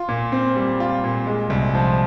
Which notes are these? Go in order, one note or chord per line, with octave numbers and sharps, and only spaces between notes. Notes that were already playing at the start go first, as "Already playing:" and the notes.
Already playing: F4
A#2
C4
G3
F4
A#2
G#3
C2
F3